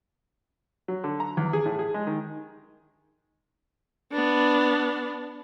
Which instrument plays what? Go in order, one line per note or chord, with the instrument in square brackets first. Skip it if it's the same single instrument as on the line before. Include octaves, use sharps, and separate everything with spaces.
[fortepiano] F#3
D3
A#5
E2
G#4
A2
G#4
G#3
D#3
[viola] B3 D4